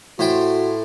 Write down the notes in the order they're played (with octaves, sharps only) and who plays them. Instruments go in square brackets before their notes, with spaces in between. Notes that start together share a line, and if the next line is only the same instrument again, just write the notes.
[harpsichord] A2 C5 G5 [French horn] F#4